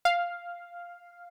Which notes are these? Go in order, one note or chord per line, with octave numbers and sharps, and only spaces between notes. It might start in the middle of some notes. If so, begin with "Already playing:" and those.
F5